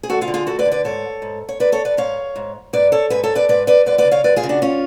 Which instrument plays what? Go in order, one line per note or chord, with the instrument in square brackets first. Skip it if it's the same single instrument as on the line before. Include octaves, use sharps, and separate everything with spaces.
[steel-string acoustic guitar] G#4
D2 F#4 A4
F4 G#4
D3
F4 G#4
D2 F#4 A4
B4 D5
D3
B4 D5
G#2 A4 C#5
G#2
C#5
G#2 B4 D5
A4 C#5
B4 D5
G#2 C#5 F5
G#2
G#2 B4 D5
A4 C#5
G#2 G#4 B4
A4 C#5
B4 D5
G#2 B4 D5
B4 D5
F#2 B4 D5
B4 D5
C#3
C#5 F5
F#2 B4 D5
F4 G#4
C#3
D4 F#4
C#4 F4